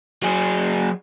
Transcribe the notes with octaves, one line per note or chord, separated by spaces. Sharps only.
F#3 G#4